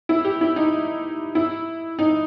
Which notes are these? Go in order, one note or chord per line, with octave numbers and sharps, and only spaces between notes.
E4
G4
E4
D#4
E4
D#4